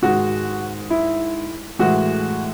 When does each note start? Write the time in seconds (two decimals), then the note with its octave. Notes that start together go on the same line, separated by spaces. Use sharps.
0.02 G#2 D#3 G#3 F#4
0.90 E4
1.79 A2 E3 G#3 F#4